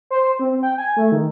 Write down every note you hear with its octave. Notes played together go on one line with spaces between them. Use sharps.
C5
C4
G5
G#5
A3
D#3